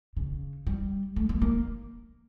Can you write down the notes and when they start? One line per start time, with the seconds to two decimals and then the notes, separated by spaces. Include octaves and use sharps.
0.17 C#3
0.67 G3
1.16 A3
1.29 A#3
1.42 A#3